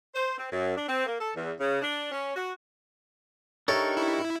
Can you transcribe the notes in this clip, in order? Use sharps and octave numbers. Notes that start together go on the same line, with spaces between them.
C5
C4
F#2
D4
C4
A#3
A4
E2
C#3
D4
C#4
F#4
D4 D#4 G4 A4 A#4 C#5 E5 C#6
E4